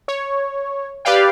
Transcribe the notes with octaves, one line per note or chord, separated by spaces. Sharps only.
C#5
G4 B4 D5 F5 G5